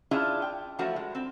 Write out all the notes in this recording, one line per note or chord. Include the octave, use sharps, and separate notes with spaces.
C#4 D4 E4 F4 G#4 E5
G5
E3 F3 A3 C#4 E4 F#4
G#3
C4